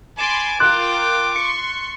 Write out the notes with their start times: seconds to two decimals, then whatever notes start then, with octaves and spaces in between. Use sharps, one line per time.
0.19 G#5 B5 C6 D6 A6 E7
0.60 F4 A#4 G5 C6 D6 F#6
1.36 C6 C#6 C#7